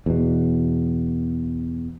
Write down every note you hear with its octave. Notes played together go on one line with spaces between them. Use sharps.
E2 B2